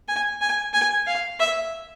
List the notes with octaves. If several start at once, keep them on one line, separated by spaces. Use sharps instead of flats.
G#5
G#5
G#5
F5
E5